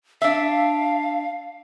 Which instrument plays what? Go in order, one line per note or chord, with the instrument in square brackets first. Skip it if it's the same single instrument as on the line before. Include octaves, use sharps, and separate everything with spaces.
[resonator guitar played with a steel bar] D4 E5 [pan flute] F5